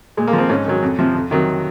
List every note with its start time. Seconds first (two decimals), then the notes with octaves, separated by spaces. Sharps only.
0.17 A#2 G#3
0.27 A#3
0.33 F3
0.38 C4
0.49 G#2 C#4
0.66 D#3 F#3
0.83 F2
0.99 C3 F3
1.15 F2
1.31 C3 D#3 F#3